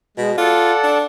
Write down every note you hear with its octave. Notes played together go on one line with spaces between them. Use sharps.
B2 G#3
F4 A4 D5 F#5
D4